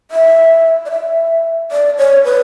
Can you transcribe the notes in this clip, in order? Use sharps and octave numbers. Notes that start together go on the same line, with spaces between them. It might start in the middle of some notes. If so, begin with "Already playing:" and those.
E5
D5
E5
D5
C#5
B4